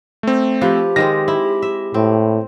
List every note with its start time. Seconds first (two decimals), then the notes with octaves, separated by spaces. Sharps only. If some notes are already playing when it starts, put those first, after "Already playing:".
0.23 A3 C4
0.61 F3 G4 B4
0.96 D#3 G#3 C4 A#6
1.28 E4
1.62 E5
1.94 A2 C4